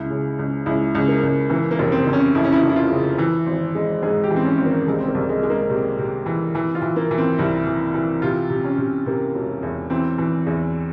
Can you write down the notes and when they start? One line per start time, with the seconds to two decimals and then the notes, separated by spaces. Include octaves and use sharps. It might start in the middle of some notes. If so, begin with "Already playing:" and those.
Already playing: C#2 E4
0.10 C#3
0.39 C#2
0.66 C#2 E4
0.95 C#2
1.08 A#3
1.23 C#2
1.50 E3 A#3
1.71 A#3
1.79 F1
1.92 C4
2.07 F1
2.13 C#4
2.35 F2 E4
2.44 C#4
2.52 E4
2.63 F1
2.70 E4
2.76 F4
2.91 C#3
3.18 E3
3.46 G#1
3.75 G#3
4.03 G#2 G#4
4.24 G4
4.30 E3
4.36 C4
4.44 C#4
4.58 G#1
4.65 A#3
4.86 C2 G#3
4.98 C4
5.08 A#3
5.15 C2
5.29 G#3
5.43 G#3
5.50 A#3
5.70 C3
5.98 C3
6.26 E3
6.55 E3
6.75 F4
6.82 E3
6.96 A#3
7.11 E3
7.18 C4
7.38 C2 E4
7.67 E3
7.94 E3
8.22 C3 F4
8.50 C3
8.64 C#4
8.78 C3
9.06 C3 A#3
9.35 E1
9.63 E2
9.90 E3 C4
10.18 E3
10.46 E2